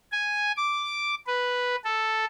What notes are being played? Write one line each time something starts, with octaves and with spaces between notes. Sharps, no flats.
G#5
D6
B4
A4